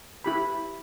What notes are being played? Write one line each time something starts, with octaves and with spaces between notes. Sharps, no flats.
E4 G4 B5